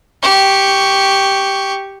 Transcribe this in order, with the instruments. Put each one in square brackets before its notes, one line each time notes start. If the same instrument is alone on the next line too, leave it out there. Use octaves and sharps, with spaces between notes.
[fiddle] G4 C#6